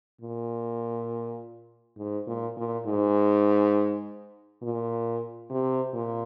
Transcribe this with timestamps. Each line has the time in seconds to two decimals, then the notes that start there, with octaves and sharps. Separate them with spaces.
0.21 A#2
1.98 G#2
2.27 A#2
2.57 A#2
2.85 G#2
4.62 A#2
5.50 C3
5.94 A#2